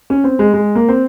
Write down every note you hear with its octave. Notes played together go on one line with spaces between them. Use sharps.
C#4
C4
G#3
G#3
A#3
C4